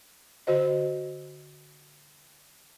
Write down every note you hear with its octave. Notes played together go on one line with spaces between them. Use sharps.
D3 F#4 C5 D#5